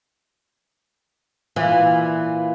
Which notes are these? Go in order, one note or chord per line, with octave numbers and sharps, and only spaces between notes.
A#2 E3 F5 G#5